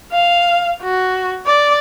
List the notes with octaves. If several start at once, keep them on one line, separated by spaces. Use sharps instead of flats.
F5
F#4
D5